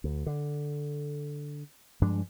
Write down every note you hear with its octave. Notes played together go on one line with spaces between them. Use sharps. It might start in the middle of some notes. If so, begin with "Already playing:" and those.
D2
D3
G2 F3 G#3 D4